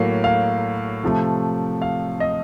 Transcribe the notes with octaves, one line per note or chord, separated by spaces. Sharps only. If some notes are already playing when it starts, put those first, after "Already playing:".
Already playing: A2 F#3 A#3 F5
F5
C3 F3 A3
F5
D#5